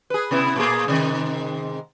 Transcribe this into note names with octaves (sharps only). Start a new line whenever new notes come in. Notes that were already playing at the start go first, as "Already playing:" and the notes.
G#4 B4
C3 B3 E4
A#2 A#3 G#4
G#2 C3 D#3